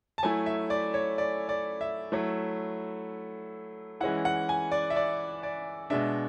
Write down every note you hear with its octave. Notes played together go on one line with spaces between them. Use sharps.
A5
F#3 A3 E4 G#5
E5
D5
C#5
D5
D5
E5
F#3 A3 E4
E3 G#3 C#4 E4 F#5
F#5
G#5
D5
E5
D5
D5
B2 G#3 D4 E5